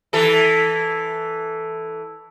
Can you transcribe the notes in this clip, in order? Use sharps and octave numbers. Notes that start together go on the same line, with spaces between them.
E3 A4